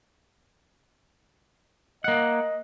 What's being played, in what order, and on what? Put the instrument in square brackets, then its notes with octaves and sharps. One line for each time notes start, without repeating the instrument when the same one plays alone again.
[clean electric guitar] A#3 F#5 [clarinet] D#5